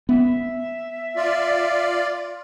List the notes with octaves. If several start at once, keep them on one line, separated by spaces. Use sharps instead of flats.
B3 E5
F4 D5